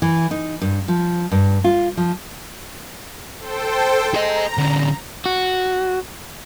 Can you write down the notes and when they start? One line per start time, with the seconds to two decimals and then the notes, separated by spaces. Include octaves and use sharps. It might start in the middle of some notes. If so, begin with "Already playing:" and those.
0.02 E3
0.31 D#4
0.62 G2
0.88 F3
1.32 G2
1.64 F4
1.97 F3
3.40 A4 C5 G5
4.14 G#4 D#5 A#5
4.58 D3 C#4
5.26 F#4